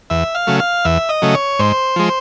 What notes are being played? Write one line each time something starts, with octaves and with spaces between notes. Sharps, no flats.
E2 E5
F5
C#3 F#3 A3
F5
E2 E5
D#5
C#3 F#3 A3
C#5
G#2 C5
F3 G#3